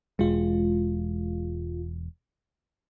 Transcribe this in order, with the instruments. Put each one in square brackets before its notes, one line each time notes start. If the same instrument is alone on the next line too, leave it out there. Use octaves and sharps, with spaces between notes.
[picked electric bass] E1 [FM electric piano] G#3 F4